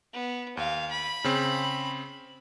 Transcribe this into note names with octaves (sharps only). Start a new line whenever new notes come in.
B3
D#2 F5
B5
C#3 C4